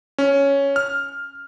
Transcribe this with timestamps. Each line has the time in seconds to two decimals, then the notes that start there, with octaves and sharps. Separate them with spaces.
0.18 C#4
0.76 F6